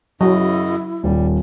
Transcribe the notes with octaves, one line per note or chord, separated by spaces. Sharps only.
F#2 C#3 F#3 E4 D#5
D#1 G3